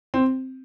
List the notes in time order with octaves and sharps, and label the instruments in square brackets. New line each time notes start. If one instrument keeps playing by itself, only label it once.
[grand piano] C4